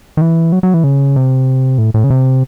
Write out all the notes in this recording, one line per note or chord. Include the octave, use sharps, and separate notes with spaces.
D#3
E3
F#3
F#3
E3
C#3
C3
A2
A2
C#3
C3